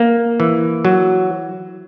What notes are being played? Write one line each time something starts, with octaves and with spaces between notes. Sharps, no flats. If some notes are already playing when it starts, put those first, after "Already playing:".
Already playing: A#3
E3
F#3